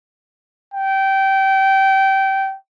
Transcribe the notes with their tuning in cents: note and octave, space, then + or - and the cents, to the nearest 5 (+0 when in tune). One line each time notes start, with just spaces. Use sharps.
G5 -20